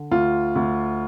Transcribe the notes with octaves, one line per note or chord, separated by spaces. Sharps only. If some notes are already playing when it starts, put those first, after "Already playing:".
Already playing: D3
D2 F4
D2